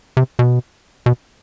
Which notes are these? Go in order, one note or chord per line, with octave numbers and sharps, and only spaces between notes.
C3
B2
B2